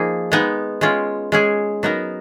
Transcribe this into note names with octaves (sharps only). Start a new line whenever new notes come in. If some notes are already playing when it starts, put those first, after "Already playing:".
Already playing: F3 A#3 D#4 G#4
G#3 B3 D#4
G#3 C#4 F4
G#3 C#4 G#4
F#3 B3 D#4 A#4